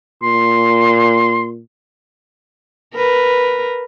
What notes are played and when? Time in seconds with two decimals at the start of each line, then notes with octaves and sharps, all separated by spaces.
0.23 A#2 C6
2.94 A#4 B4